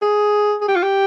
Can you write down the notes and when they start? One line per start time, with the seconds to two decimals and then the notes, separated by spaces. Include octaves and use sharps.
0.02 G#4
0.61 G#4
0.68 G4
0.76 F4
0.83 G4